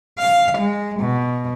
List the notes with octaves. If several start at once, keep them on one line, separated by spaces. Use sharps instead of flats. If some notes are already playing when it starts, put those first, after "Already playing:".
F5
G#3
B2